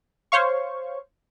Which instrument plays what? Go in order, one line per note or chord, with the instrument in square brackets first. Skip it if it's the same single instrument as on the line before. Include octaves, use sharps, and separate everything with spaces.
[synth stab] C5 C#5 F5 C#6